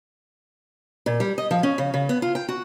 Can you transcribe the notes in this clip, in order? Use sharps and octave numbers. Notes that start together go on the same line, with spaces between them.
A#2
G3
D#5
F3
C#4
C#3
C#3
B3
F4
G5
F#4